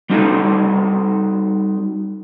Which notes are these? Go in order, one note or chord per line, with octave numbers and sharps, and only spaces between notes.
G3 C4 D#4 F#4 A4